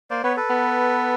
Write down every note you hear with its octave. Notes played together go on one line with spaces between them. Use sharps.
A#3 C5 D5
B3 B4 C#5
A4 B4
B3